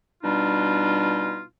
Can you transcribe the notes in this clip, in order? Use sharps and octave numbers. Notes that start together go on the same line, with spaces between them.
B2 G3 D4 D#4 F4